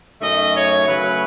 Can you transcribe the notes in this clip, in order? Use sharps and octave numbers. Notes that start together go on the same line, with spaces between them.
F#2 D#3 A3 D#5
C#5
C#3 F#3 A3 B4